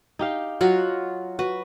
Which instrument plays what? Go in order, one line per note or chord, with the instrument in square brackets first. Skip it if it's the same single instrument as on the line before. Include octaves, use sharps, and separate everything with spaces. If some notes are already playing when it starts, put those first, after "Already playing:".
[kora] D#4 G4 F5
[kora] F#3 [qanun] F4 F#4 F#5
[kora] F#4 [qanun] B4